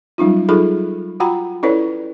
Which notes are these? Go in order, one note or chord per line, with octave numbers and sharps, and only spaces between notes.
F#3 G3 C#4 D#4 F4
F#3 D#4 F4 G#4 A4 B5
F4 F#4 F#5 G5 A#5 B5
C#4 E4 A4 B4 C#5 D5